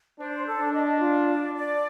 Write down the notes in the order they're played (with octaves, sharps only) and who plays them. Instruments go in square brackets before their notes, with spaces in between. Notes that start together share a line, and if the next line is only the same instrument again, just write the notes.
[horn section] D4 [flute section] C5
[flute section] A4
[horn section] D4
[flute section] D#5
F4
D5
D5